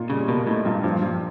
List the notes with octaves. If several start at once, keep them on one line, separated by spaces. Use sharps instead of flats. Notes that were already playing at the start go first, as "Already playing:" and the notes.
Already playing: A#2 D#4
C#3 G3
B2 A#3
A2 D#4
G2 A#2
G2 F3
G2 F3